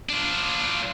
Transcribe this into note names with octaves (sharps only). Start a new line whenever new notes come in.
D4 F4